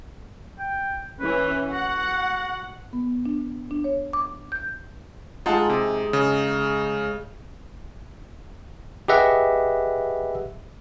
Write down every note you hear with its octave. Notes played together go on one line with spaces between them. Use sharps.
G5
E3 C#4 B4
F#4 F#5
B3
D4
D4
C#5
D6
G6
G#3 D#4 F4 F#5 A5
C3
C#3
G4 G#4 B4 D#5 E5 F#5